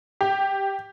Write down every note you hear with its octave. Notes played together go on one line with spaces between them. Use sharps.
G4